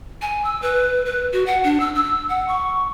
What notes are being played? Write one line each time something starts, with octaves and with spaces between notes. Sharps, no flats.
G#5
E6
B4
B4
F#4
F#5
D4
E6
E6
F#5
C#6